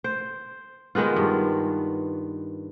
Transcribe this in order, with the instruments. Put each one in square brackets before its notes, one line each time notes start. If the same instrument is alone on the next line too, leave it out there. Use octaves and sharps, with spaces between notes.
[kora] C5
D#3 G#3 B3 F4
G2